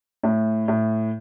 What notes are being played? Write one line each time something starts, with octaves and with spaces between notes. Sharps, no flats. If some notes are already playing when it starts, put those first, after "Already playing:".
A2
A2